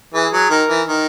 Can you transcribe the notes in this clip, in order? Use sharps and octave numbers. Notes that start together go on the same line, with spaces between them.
E3 G#4
F#3
D#3 A#4
E3
D#3